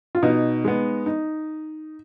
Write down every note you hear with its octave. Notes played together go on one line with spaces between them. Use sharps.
F4
B2 D#4
G#3 B3
D#4